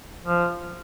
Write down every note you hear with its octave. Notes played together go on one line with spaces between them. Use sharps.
F3